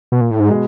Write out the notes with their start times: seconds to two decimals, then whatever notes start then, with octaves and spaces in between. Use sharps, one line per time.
0.12 B2
0.21 A#2
0.31 A2
0.40 G#2
0.50 B2 G#3